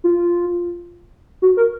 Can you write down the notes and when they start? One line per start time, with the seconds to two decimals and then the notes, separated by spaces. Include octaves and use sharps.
0.04 F4
1.42 F#4
1.57 A#4